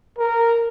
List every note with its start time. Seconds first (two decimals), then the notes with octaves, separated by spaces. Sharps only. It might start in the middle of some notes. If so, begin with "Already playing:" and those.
0.19 A#4